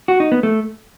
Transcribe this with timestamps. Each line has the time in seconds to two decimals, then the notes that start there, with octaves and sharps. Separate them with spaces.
0.08 F#4
0.20 D#4
0.32 B3
0.43 A3